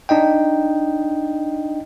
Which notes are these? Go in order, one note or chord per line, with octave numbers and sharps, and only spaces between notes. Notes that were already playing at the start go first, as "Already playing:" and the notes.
D4 D#4 D#5 G5